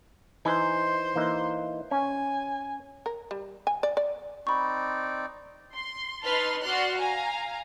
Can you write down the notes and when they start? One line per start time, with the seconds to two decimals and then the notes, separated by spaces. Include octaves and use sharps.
0.45 E3 D#4 C5 G#5
1.16 E3 A#3 D#4
1.91 C#4 G#5
3.06 A#4
3.31 G3
3.67 G#5
3.83 D5
3.97 D5
4.47 C4 D#4 D5 B5 C#6
5.76 C6
6.23 D#4 B4 A5 C6 F6
6.62 F#4 D5 C6 F6 F#6
6.98 F5 G#5 A#5